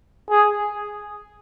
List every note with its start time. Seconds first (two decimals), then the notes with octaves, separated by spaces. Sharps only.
0.30 G#4